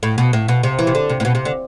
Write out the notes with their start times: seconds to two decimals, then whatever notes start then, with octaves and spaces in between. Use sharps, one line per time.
0.03 A2
0.18 B2
0.33 A2
0.48 B2
0.63 C3
0.79 E3
0.87 C3
0.95 D3
1.09 C3
1.20 A2
1.25 B2
1.35 C3
1.45 D3